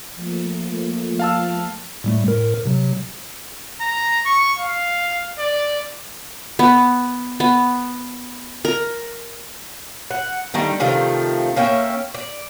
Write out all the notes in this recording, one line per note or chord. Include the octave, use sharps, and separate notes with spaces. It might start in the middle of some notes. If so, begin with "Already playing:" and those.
F3 A3 A#3
F5 A5 E6
A2 G3 A3
A2 A#4
C3 F#3
A#5
C#6
F5
D5
B3
B3
A#4
F#5
D#3 G3 A3 D#4
C3 D#3 F3 A3
A#3 C#4 E5 G5
D5